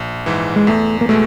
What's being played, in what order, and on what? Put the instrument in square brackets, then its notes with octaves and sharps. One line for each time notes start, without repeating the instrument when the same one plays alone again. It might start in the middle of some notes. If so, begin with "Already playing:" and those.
Already playing: [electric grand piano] A#1
G#2 E3
[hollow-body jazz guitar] G#3
[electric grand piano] E2 [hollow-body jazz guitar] A3
[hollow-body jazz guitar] A#3
[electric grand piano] B2 G#3 [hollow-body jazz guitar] A3